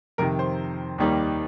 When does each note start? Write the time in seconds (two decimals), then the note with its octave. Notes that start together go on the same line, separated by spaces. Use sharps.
0.18 F2 C3 D#3 A#4
0.39 C5
0.98 D#2 D#3 G3 A#3 D#4